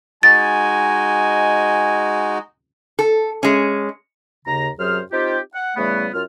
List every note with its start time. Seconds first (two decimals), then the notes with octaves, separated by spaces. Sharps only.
0.23 G#3 D#4 F#4 G#5 A6
2.99 A4
3.43 G#3 C#4
4.45 D#2 C#3 A#5
4.78 F#2 C3 F#3 G#4 C5 F6
5.11 C4 D#4 F4 G4
5.54 F#5
5.77 C#3 E3 G3 A3 B3
6.13 F#2 F4 F6